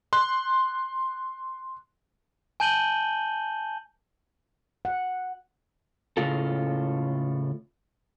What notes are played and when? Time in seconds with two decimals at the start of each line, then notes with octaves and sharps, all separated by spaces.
0.13 C6 F#6
2.60 G#5 A5 G6 D#7 F#7 G7
4.85 F#5
6.17 A2 C#3 F4 A4